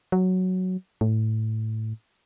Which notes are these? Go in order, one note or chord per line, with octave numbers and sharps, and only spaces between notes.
F#3
A2